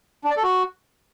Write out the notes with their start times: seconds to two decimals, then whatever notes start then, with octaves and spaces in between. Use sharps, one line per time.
0.24 D4
0.30 D5
0.37 A4
0.43 F#4